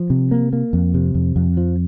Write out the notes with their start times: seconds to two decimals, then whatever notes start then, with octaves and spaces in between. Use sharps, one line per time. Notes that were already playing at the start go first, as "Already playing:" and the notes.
Already playing: F3
0.10 C3
0.31 A#3
0.53 A#3
0.73 F2
0.94 C3
1.15 F2
1.36 F2
1.57 F3